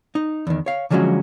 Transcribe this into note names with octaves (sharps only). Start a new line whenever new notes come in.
D#4
E2 D#3
C#5 F5
D3 F3 F#3 G#3 C#4 F#4